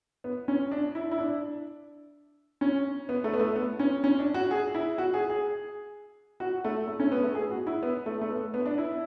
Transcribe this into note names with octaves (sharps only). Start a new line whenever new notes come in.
B3
C#4
D4
E4
E4
D4
C#4
B3
A3
B3
A3
B3
C#4
C#4
D4
F#4
G#4
E4
F#4
G#4
G#4
F#4
A3
A3
C#4
B3
A3
G#4
F#4
E4
B3
A3
A3
B3
B3
D4
E4